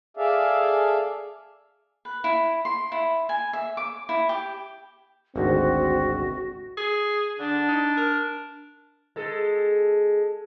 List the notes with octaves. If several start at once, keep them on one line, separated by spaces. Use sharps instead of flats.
G#4 A4 D5 E5 F5
B4
E4
C6
E4
G#5
E5
D6
E4
G4
G#1 D2 C4 F#4
G#4
D3 D4
D#4
A#4
G#3 A4